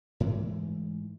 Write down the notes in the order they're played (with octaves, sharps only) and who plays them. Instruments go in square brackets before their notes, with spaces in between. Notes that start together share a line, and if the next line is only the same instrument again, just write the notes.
[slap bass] G#2 E3 G#3 A3